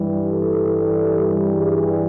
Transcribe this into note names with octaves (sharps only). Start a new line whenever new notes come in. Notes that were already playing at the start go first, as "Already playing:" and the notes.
Already playing: G2 E3 G3
A4
G#4